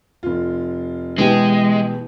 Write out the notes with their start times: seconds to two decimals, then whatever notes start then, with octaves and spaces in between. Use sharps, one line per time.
0.23 F1 F4
1.18 B2 E3 G#3 G4